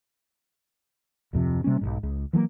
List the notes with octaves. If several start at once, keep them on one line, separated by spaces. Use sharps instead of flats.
D1 F2 C3 F3
C3 G3 A#3 C#4
B1 F2 G#2
C#2
E3 F#3 G#3 A#3